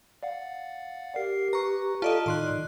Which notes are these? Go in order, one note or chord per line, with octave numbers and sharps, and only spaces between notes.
D5 F5 F#5
G4 A#4 C7
B4 A#5 C#6
F4 A4 D5 D#5 A5
A2 D#3 D#4 D5 C6 F#6